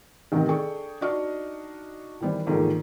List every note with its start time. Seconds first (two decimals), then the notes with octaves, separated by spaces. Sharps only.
0.32 A1 C3 D#3 D#4
0.48 D4 G#4 A4 G5 C#6
1.01 D4 D#4 F#4 D#5 C#6 F6
2.21 D#3 E3 G3 B3 C5
2.47 E2 G#2 D3 D#3 F3 A#3